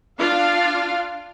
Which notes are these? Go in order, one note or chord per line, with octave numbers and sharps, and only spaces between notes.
D4 F4 F5